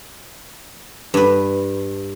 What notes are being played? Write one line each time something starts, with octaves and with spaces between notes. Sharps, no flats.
G2 B4